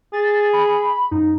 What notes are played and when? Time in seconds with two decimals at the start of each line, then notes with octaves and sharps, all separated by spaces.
0.13 G#4 A6
0.53 B5
1.11 F#2 D#4